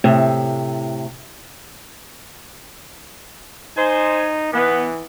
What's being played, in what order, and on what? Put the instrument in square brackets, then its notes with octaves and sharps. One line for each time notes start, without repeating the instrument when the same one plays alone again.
[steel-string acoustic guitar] A2 C3
[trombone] D#4 [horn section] C5 G#5
[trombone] E3 [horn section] B3